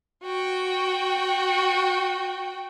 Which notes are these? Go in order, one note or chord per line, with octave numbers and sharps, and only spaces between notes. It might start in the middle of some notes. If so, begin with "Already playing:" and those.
F#4 G5